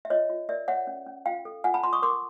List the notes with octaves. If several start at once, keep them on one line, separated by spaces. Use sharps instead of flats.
E5
F4 C#5 D#5
F4
A#4 D5 E5
C#5 E5 F#5
C#4
C#4
F4 F5 G5
A4
F4 F#5 G#5
A5 B5
F4 A#5 C6
C#6 D#6
A#4 C6 D6